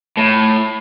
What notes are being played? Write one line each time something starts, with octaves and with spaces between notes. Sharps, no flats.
A2